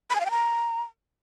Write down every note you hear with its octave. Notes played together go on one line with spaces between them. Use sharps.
B5
G#5
F5
G5
A#5